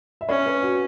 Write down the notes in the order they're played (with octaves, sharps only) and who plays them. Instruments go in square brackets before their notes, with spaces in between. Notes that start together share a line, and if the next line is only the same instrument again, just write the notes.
[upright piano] E5
[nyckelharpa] C#4 [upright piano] C#5
[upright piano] B4
F#4